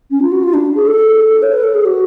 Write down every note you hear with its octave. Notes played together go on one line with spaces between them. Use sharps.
C#4
F4
F#4
F4
D4
G#4
A4
C#5
B4
A4
G#4
F#4